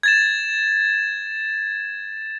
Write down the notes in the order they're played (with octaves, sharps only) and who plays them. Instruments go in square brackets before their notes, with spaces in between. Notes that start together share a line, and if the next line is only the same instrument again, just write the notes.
[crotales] G#6 A6 E7